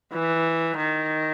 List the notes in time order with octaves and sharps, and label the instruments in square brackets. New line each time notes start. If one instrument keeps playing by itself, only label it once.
[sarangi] E3
D#3